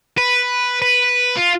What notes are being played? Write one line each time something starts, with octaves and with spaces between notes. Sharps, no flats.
B4
B4
F4